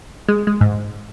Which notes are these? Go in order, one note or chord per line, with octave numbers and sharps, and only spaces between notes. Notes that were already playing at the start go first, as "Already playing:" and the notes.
G#3
G#3
G#2